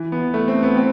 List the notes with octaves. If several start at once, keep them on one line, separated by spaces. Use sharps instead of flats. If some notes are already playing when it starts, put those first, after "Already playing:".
Already playing: E3
B3
A3
C4
B3
C4